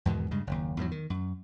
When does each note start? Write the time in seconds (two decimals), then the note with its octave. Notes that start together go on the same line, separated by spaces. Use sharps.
0.06 E2 G#2 B2 D#3
0.31 G2 C#3 G#3
0.47 F#1 D#2
0.77 E2 G#2 E3 F#3
0.91 D#3
1.10 F#2